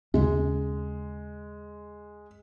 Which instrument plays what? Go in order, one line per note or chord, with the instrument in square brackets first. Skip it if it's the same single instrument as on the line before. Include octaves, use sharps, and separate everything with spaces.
[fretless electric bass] D#2 C#3 C#4 [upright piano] G#3